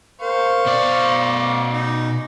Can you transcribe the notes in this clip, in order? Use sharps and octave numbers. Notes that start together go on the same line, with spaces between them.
A#4 C5 F5 C#6
B2 D5 D6
D#4